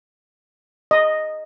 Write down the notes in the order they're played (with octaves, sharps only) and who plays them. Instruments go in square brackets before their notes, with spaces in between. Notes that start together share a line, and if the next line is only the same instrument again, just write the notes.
[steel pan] D#5